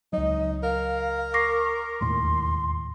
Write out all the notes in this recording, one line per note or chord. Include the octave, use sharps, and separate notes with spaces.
C#2 F#3 D#4 D#5
A#4 F5
C#6 D6 A#6 C7
E1 D#2 A2 C6